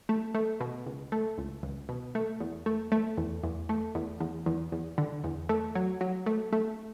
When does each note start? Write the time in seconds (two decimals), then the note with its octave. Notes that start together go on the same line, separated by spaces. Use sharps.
0.09 A3
0.35 A3
0.60 B2
0.86 C#2
1.12 A3
1.38 C#2
1.63 C#2
1.89 B2
2.15 A3
2.40 E2
2.66 A3
2.92 A3
3.18 E2
3.44 E2
3.69 A3
3.95 E2
4.21 E2
4.46 E2
4.72 E2
4.98 D3
5.24 E2
5.49 A3
5.75 F#3
6.01 F#3
6.26 A3
6.53 A3